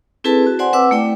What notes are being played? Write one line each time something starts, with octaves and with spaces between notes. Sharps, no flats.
C4 E4 G#4 A4 B4 A5
F#4
C5 D5 F#5 G#5 C6
C4 B4 F#5 D6 E6
A3 E4 D5 G5